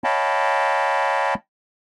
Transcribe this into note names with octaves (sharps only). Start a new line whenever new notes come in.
C#5 D#5 F5 G5 A5 B5